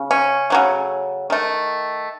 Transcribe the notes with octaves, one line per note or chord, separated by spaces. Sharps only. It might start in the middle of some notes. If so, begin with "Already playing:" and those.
Already playing: C#3
C#4
C#3 F#3 A3
D#3 A3